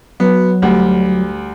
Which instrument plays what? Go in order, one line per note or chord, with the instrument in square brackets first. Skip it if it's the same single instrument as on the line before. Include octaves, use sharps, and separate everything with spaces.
[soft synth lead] F#3 [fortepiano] B3
[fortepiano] D2 G3